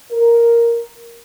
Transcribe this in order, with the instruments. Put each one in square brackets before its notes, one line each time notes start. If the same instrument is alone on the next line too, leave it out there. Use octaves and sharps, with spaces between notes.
[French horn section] A#4